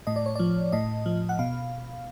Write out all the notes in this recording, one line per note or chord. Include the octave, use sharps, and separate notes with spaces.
A2 D#5
D5
C#5
F3 D5
A2 D#5
F3
F#5
B2 F5